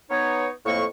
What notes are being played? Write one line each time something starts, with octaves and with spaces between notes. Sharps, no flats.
B3 D#4 C#5
F2 A2 A#3 C#6